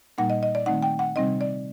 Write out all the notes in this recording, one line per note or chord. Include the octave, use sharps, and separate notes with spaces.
A#2 G3 A#3 D#4 F#5
D#5
D#5
D5
D#3 A3 C4 D#4 F#5
G5
F#5
C3 G3 C4 D#4 D#5
D5